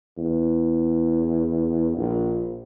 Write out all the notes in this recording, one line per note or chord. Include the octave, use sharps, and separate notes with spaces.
E2
A#1